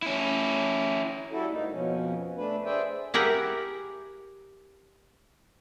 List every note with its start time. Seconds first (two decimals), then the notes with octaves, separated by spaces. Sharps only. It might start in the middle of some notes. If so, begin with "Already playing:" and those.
0.02 C#4 E4
1.31 G3 E4 F#4 A4
1.51 G#2 A#3 D#4
1.72 F2 B2 F3 C#4
2.37 A3 D4 B4
2.65 G#4 C5 D5 E5 G5
3.14 E4 G4 G#4 A#4 F#5